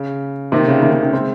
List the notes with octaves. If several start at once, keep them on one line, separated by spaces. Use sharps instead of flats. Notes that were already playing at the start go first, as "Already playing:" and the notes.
Already playing: C#3
C3 D#3
C#3
C3 D#3
C#3
C#3
G#3 C4